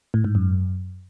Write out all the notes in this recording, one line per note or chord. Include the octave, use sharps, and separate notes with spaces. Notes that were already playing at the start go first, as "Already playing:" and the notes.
A2
G#2
F#2